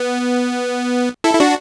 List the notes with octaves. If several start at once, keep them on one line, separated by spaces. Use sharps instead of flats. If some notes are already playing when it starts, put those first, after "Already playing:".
Already playing: B3
E4 A4
E4
D4 F#4